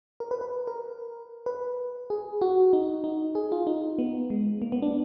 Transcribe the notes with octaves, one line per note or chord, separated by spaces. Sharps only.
A#4
B4
B4
A#4
B4
G#4
F#4
D#4
D#4
G#4
F4
D#4
B3
G#3
A#3
B3
D4